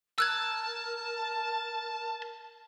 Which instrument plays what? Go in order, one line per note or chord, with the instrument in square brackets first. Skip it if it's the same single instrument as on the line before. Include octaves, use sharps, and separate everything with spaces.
[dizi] A#4 [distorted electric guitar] A5 [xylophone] E6 F#6 G#6